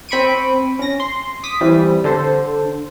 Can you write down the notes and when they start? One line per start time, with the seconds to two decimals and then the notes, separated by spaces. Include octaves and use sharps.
0.09 C4 B5 C#6 D7 D#7
0.79 C#4 A#6
1.00 C6
1.43 D6 D#6 B6
1.61 E3 G3 C4
2.04 D3 A4 C5